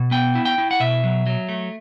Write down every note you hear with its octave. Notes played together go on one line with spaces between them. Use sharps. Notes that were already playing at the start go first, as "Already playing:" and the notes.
Already playing: B2
B3 G5
E4
G5
E4
F#5
B2 E5
F#3
F#3
A3